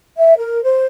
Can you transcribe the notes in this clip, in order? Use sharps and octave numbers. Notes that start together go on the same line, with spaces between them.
E5
A#4
C5